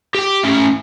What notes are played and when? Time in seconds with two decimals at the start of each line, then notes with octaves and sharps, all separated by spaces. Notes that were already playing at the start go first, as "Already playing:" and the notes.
0.15 G4 G5
0.43 A3 C#4